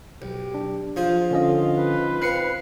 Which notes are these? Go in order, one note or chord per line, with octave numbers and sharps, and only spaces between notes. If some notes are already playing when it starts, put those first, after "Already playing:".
B1 G4
D4
F3 F4 G#4 C5
D3 C#4 F4 D#5
B4
C4 F5 F#6 C7 C#7